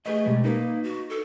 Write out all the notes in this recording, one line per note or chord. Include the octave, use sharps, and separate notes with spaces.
A3 G#4 B4 D#5
B2 G3 G#3
A#3 D#4 A#4 B4
F#4
A4